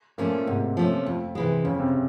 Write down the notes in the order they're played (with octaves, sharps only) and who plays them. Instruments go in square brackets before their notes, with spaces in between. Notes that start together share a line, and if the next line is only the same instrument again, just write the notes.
[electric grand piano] A#2 A#3 [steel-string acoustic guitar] F3 A3 C#4
[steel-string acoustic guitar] G#2 [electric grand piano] C3 C4
[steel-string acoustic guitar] F3 A3 C#4
F2
C3 E3 G#3
[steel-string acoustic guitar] F2 [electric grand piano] C#3 C#4
[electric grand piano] C3 C4